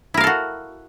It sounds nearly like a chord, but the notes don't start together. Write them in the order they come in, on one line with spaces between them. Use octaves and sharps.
E4 A#4 F5 A4 F#4